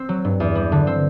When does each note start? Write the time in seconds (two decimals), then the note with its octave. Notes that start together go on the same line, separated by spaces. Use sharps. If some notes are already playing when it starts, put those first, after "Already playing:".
Already playing: C4
0.09 F#3
0.25 G2
0.40 E2
0.55 G3
0.72 D3
0.87 C4